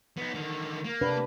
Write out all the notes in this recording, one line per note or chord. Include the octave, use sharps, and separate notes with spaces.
B3 D#4
D3 D#3
A#3
C3 D4 B4